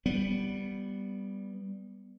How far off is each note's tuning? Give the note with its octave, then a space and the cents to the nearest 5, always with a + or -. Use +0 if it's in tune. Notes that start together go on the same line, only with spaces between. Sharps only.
G3 +0 B3 +0